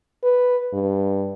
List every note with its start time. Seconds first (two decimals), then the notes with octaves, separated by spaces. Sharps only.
0.23 B4
0.73 G2